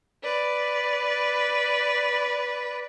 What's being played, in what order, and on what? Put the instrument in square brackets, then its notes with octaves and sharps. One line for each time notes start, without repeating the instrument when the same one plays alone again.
[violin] B4 D5